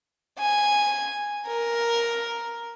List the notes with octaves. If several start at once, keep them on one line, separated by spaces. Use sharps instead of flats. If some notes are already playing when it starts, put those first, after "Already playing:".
G#5
A#4